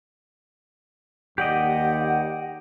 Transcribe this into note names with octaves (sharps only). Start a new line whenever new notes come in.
D#2 G4 D5 D#5 F#5